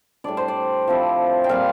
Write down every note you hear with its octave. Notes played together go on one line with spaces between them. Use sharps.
A2 G3 D4 D5
C5
D5
F3 C4 E4
G5
A#2 G3 C4 F5